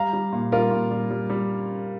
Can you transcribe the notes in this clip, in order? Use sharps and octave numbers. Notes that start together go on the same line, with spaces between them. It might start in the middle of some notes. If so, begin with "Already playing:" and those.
Already playing: G3 F5 A#5
G3
A#2
G3 F4 A#4
A#2
G3
G3
G3